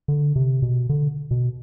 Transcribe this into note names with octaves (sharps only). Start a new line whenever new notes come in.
D3
C3
B2
D3
B2